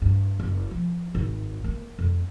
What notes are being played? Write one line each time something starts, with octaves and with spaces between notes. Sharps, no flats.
G2
F#1
F3
G#1
A#3
F2